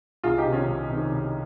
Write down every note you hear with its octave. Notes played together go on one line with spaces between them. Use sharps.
C2 F4 G#4
D#4 G4
C3 D#3
C#4 F4
C2
C3 D#3
C2